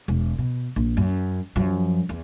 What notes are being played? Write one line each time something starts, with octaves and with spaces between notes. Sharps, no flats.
E1
B2
A#1
F#2
F#2 F3
E2